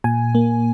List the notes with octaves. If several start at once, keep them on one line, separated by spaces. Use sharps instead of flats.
A#2 G#5
A#3